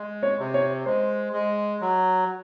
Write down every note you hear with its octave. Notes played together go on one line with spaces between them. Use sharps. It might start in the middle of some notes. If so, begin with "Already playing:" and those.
Already playing: G#3
C#5
C3
C#5
G#3 C5
G#3
F#3